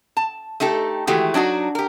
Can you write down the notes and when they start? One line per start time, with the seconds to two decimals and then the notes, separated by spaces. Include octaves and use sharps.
0.17 A5
0.60 A3 D#4 G4 A4
1.07 D#3 E3 G#3 A3 F#4 G4
1.34 F#3 D4 D#4 F#4
1.75 G4 A#4